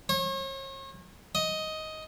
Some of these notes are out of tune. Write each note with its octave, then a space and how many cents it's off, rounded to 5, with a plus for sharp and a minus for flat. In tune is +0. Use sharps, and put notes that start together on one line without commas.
C#5 -40
D#5 +10